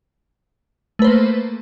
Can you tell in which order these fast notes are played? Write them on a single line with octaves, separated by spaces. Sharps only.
A3 B4 C5 A#3